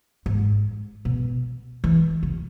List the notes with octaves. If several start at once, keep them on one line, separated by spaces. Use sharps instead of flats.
G#2
B2
E3
C#3